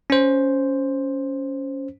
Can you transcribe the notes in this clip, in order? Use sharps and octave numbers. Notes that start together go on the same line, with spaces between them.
C#4 C5